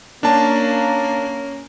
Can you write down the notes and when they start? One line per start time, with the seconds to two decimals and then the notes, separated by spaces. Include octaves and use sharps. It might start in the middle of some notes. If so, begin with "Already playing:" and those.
0.23 A#3 C#4 D4 A5